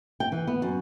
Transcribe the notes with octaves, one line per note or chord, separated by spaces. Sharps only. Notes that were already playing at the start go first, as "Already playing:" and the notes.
G5
E3
B3
F#2